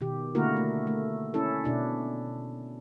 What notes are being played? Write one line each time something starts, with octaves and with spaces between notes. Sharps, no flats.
B2 D#3 G4
D3 A3 A#3 E4 F#4 A#4
A3
A3
C#4 E4 A4
B2 D4 E4